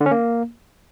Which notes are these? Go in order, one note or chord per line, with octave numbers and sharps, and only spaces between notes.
D3
C#4
A#3